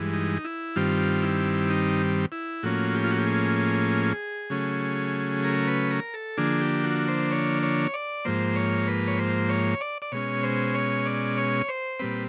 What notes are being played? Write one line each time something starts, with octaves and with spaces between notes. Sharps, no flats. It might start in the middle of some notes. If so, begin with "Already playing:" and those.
Already playing: G2 E3 G#3
D#4
E4
G2 D#3 G3 C4 F4
E4
D#4
E4
A2 F3 A#3 C#4 F#4
G4
F4
F#4
G4
G#4
C#3 F#3 A3 C#4
A#4
B4
A#4
A4
D3 F3 A#3 D4 G#4
G4
F#4
C5
C#5
C#5
D5
G#2 F3 A#3 C5
C#5
B4
C#5
C5
C#5
D5
D5
B2 G#3 C#4 C#5
C5
C#5
D5
C#5
C5
A#2 G3 C4 B4